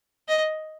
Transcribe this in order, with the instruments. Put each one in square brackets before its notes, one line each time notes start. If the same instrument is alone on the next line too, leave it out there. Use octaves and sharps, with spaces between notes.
[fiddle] D#5